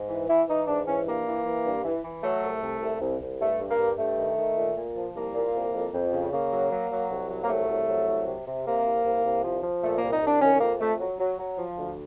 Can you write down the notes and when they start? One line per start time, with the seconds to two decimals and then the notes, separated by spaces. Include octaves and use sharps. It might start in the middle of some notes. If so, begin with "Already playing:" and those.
Already playing: G#2
0.09 E3
0.28 E3 E4
0.48 E3 D#4
0.67 G#2 D4
0.87 E3 C#4
1.06 G2 A#3
1.26 E3
1.45 E3
1.65 G2
1.85 E3
2.04 E3
2.24 F#3 A3
2.43 C2
2.62 C2
2.82 C2
3.01 C2
3.20 C2
3.40 G2 A3
3.59 G2
3.70 A#3
3.79 G2
3.98 G2 A3
4.18 D#3
4.37 D#3
4.57 A#2
4.76 A#2
4.96 F3
5.15 C2 A#3
5.34 A#2
5.54 C2
5.74 F2
5.93 F2
6.13 C#3
6.32 C#3 A#3
6.51 F#3
6.71 F#3
6.91 F#3
7.11 C2
7.29 F#3
7.43 A#3
7.49 C2 A3
7.68 C2
7.88 F#3
8.08 C2
8.27 C3
8.47 C3
8.66 C3 A#3
8.86 C2
9.05 C2
9.25 C2
9.43 F3
9.63 F3
9.83 A#2 A3
9.98 A#3
10.03 C2
10.13 D#4
10.22 C2
10.27 D4
10.41 D#3 C#4
10.60 F2 A#3
10.80 F2 A3
11.00 F#3
11.19 F#3
11.39 F#3
11.58 F3
11.78 D2